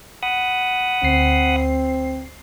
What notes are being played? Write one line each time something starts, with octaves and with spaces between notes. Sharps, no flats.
F#5 B5 D#6
D2 C4 C7